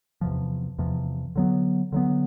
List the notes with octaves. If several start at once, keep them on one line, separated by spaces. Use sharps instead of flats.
E2 C3 F3
E2 C3 F3
D3 F#3 B3
D3 F#3 B3